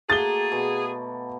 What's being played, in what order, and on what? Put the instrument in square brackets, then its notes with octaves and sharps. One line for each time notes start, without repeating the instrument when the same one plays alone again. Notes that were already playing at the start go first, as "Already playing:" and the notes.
[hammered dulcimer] A3 A#3 F#4 [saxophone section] G#4 [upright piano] A6 G7
[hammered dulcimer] B2